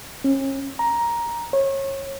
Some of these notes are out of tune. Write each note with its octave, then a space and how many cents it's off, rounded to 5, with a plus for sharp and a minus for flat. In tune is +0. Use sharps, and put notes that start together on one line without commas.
C#4 -35
A#5 +10
C#5 -30